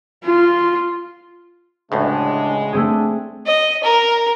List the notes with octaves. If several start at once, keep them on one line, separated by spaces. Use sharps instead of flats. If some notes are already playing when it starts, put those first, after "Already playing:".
F4
A1 D2 A2 C#3 G#3 D4
A3 C4 D4 G#4
D#5
A#4